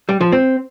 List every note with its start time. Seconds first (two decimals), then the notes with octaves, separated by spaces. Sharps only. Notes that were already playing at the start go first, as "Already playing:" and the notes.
0.09 G3
0.21 F3
0.32 C4